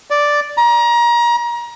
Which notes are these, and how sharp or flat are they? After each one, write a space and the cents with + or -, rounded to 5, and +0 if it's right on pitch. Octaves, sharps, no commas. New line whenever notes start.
D5 +0
A#5 +30